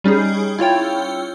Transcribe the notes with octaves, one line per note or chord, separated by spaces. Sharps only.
G3 C#4 D#4 G#4
E4 F4 C#5 G5